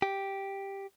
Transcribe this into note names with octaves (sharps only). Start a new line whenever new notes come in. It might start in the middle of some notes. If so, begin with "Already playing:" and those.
G4